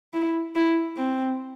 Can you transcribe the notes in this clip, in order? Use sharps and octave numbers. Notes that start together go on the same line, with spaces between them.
E4
E4
C4